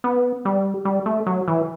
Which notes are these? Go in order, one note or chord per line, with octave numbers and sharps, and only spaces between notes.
B3
G3
G3
A3
F#3
E3